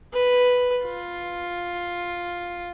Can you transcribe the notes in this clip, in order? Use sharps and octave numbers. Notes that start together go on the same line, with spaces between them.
B4
F4